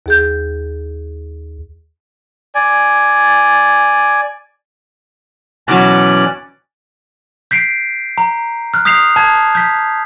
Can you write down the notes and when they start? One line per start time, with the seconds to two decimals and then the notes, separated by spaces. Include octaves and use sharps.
0.06 D#2 G#4 G6
2.55 D5 G#5
5.68 B2 E3 F#3 C#4 D5 F#6
7.51 G6 B6 C7 D7
8.18 A#5
8.74 F6 F#6
8.85 D#6 G6 B6 C7 F7
9.16 A5 G#6
9.55 G6 B6